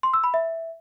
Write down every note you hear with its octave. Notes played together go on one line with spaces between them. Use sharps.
C6
E6
B5
E5